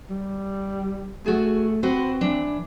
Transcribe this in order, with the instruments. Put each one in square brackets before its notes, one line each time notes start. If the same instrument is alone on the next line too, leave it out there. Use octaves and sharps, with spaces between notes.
[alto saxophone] G3
[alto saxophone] A3 [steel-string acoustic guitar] F#4 G#4
[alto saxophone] C4 [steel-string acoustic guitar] F#4 B4 C5
[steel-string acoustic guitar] E3 D4